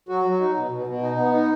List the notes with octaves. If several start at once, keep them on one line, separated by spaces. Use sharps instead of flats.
F#3 F#4
F#3
D#4
B2
B2
B2
D#4
B3
D#4